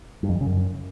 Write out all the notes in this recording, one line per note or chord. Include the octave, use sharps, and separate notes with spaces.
G2
F2
E3
C#3
F#2